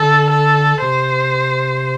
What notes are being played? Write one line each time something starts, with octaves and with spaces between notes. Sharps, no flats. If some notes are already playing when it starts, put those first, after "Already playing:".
Already playing: D3 A4
A4
C3 C5